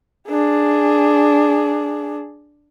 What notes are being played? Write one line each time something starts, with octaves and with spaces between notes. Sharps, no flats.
D4 G#4